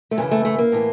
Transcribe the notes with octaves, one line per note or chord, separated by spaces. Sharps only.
A3
F#2 C#3 E3 G#3
A3
A3
A#3
A2 E3